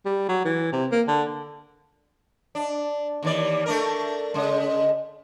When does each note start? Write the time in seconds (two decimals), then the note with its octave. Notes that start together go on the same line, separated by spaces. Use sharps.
0.05 G3
0.29 F#3
0.45 E3
0.72 C3
0.92 A#3
1.08 D3
2.55 D4
3.23 D#2 E3 D5
3.66 A3 D4 A#4
4.34 C#3 G#3